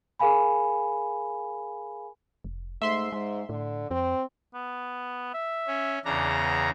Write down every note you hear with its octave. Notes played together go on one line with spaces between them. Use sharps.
G#4 A#4 F5 G#5 B5
F1
G#2 A3 E5 C6
G#2 G#3
A2 D3
F2 C4
B3
E5
C#4
E2 C#3 D4 A#5
B3